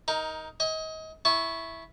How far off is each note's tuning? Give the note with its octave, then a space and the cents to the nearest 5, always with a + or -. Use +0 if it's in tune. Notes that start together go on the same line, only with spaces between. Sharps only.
D#4 +15 A#4 +0
D#5 +30 G#5 -30
E4 -5 G#5 +40 C#6 -10